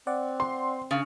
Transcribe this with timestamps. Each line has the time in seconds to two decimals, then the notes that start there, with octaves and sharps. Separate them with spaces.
0.07 C4 D5 F#5
0.40 C6
0.91 C#3